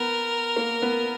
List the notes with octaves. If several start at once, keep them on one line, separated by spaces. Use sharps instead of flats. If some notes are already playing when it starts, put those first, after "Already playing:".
Already playing: B3 A#4
A#3
B3